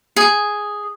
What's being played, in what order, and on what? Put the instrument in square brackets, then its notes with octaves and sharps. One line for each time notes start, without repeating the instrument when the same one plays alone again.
[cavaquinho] G#4